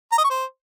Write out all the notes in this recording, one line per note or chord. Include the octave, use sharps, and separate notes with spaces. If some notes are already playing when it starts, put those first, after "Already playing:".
A#5
D#5
C#6
C5